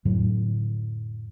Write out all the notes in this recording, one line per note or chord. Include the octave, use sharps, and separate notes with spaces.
F2 A2 D3 F#3